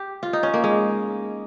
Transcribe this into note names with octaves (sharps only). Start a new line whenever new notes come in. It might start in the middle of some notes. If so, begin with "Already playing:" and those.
Already playing: G4
F4
D#4
C#4
A#3
G#3